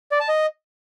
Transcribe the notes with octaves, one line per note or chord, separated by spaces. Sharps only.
D5
A5
D#5